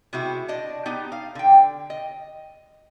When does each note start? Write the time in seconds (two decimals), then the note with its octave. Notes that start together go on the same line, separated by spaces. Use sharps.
0.13 C3 G#3 E4 F#4
0.48 D4 D#5
0.86 B3 D#4 G4
1.12 F5
1.35 D3 G5
1.90 D#5